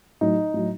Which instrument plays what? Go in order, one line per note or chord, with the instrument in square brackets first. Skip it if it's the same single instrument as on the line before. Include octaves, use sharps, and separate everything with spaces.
[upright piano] A2 F#3 D#4
A2 F#3